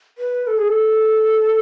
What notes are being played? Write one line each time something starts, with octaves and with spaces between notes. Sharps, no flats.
B4
A4
G#4
A4